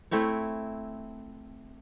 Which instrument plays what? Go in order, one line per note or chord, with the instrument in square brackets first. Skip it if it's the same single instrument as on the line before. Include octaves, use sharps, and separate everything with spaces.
[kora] A3 C4 E4 C#5